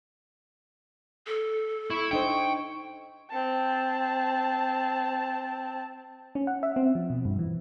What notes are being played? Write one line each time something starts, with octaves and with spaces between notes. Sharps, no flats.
A4
E4 C#6
D4 D#4 C5 G5
C4 A5
C#4
F#5
E5
C4
F3
B2
G2
E3